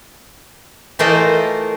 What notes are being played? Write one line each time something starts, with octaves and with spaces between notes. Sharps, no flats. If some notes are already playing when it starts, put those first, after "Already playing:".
E3 A3 F4 A#4 C5 D#5